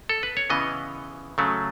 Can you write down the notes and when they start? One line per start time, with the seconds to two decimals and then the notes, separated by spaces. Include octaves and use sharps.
0.09 A4
0.23 B4
0.37 C#5
0.50 C#3 E3 B3 D#5
1.38 C#3 F#3 A3